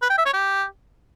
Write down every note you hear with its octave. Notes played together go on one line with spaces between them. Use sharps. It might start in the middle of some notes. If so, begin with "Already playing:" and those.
B4
G5
E5
C#5
G4